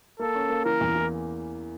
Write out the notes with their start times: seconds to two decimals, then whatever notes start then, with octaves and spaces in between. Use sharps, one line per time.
0.19 A#3 A4
0.35 C#4
0.50 A#3
0.65 E3 A#4
0.81 E2
0.95 E3